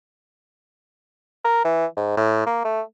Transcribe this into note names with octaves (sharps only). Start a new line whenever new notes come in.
A#4
E3
G#2
A2
A#3
A3